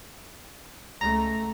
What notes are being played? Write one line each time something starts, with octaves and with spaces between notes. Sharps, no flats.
C#2 A3 A#5